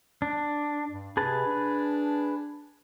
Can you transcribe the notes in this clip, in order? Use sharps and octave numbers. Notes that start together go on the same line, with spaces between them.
D4
G2
C3 G#4 B4 A5
D4